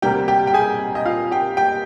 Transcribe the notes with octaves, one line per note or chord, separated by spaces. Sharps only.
D2 C3 G3 A#3 G4 G5
G4 G5
G5
G#4 G#5
D#5
F4 F5
G4 G5
G4 G5